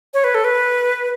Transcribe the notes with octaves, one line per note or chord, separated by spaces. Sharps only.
C#5
B4
A4
B4